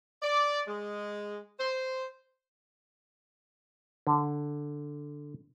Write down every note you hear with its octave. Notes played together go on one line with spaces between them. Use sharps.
D5
G#3
C5
D3